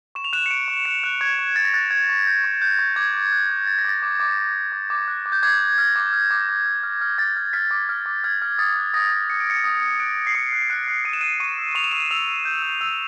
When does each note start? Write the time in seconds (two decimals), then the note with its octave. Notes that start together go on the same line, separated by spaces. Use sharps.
0.15 C#6 E7
0.24 F7
0.33 F#6 E7
0.46 C#7
0.51 F#6 D7
0.68 C#6
0.85 F#6 C#7
1.04 F#6
1.21 C#6 G#6
1.39 C#6
1.56 F#6 A6
1.65 A#6
1.74 F#6 A6
1.91 F#6 G#6
2.09 C#6
2.26 F#6 G6
2.44 C#6
2.62 F#6 G6
2.79 C#6
2.96 D6 G#6
3.14 D6
3.32 F#6
3.50 D6
3.67 F#6 A6
3.78 A#6
3.85 D6 A6
4.02 D6
4.20 D6
4.37 D6
4.54 D6
4.72 D6
4.90 D6
5.08 F#6
5.26 D6
5.32 G6
5.43 D6 G#6
5.61 D6
5.78 F6 A#6
5.96 D6
6.13 F6
6.31 D6
6.49 D6
6.66 F6
6.83 F6
7.01 F6
7.18 D6 A6
7.36 F6
7.53 F6 B6
7.71 D6
7.89 F6
8.06 D6
8.24 F6 G#6
8.42 F6
8.58 D#6 A6
8.76 F#6
8.94 D#6 A#6
9.12 D#6
9.30 D#6 C#7
9.40 D7
9.47 D#6 C#7
9.64 D#6
9.82 D#6
9.99 F#6 D7
10.17 F#6
10.27 C7
10.35 D#6 C#7
10.53 F#6
10.62 C#7
10.70 F#6 D7
10.88 F#6
11.05 D#6 D#7
11.13 E7
11.21 F#6 D#7
11.40 C#6 D#7
11.58 E6
11.75 C#6 F7
11.84 E7
11.91 C#6 D#7
12.00 E7
12.11 E6 F7
12.28 E6
12.45 G6
12.63 E6
12.81 E6